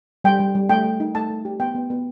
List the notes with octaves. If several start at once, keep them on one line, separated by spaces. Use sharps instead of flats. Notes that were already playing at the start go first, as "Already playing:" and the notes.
G3 G5
G3
G3
A3 G5
A3
D#4
A3 A5
A3
G4
B3 G5
B3
B3